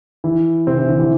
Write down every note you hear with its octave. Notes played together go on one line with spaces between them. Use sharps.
E3 E4
C3 C4
E3
D3
E3